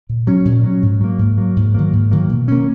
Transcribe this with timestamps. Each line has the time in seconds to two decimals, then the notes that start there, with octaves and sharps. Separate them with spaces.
0.09 A#2
0.27 F#3 C#4
0.45 A#2
0.64 F#3 C#4
0.82 G#2
1.01 F#3 A#3
1.19 G#2
1.38 F#3 A#3
1.56 G#2
1.74 D#3 F#3 A#3
1.93 G#2
2.11 D#3 F#3 A#3
2.29 B2
2.48 A#3 C#4